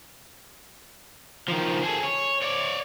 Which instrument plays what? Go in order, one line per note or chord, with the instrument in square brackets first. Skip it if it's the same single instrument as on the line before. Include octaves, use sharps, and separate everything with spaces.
[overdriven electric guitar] D#3 F3
G#4 A4
C#5
C#5 D5